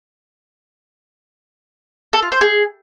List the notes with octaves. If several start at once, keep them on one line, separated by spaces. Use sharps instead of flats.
A4
F4
C5
G#4